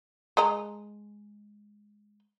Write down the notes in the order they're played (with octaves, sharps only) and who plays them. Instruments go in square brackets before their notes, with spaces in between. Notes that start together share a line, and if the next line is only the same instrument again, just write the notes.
[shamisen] G#3 D#5 A#5